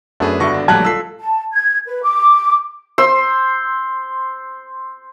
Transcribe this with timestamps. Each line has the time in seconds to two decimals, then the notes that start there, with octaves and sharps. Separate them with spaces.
0.20 F#2 A3 B3 D4 G#4 B4
0.40 G2 D3 B3 F#4 E5 C#6 A#6
0.53 G#1 D4
0.68 A#1 F#3 G3 A3 A5 F#6 G#6
0.85 F4 A4 E6 B6 C7
1.20 A5
1.54 G#6
1.86 B4
2.04 D6
2.98 C5 C6 E6